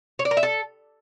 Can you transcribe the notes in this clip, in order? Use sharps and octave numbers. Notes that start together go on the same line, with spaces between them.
C#5
D5
A#4
E5
A4